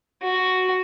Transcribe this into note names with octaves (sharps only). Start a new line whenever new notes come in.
F#4